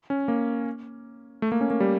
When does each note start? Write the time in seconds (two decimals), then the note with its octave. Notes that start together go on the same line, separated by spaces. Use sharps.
0.10 C#4
0.28 A#3
1.42 A3
1.52 A#3
1.61 C#4
1.70 A#3
1.80 G3